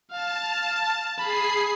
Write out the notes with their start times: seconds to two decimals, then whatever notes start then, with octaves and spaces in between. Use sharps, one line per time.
0.12 F5 A5
1.18 G#4 B5 C7